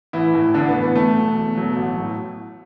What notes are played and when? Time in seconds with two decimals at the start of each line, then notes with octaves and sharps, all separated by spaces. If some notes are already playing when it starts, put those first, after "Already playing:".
0.13 A1 E3 E4
0.34 A2 E3
0.54 A1 D3 D4
0.68 B3
0.74 A2 E3
0.82 B3
0.95 E2 A3
1.15 B2 F#3
1.35 E2
1.55 B2 F#3
1.76 A1
1.97 A2 F#3